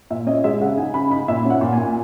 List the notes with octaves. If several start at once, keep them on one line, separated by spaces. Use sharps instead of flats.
A#2 E5
C#4 D#5
G#3 E5
C#3 F#5
D#4 G#5
C#3 B5
D#4 B5
A#2 E5
C#4
F#5
A#2
G#5
A#2